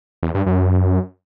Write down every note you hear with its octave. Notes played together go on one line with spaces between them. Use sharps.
E2
G2
F#2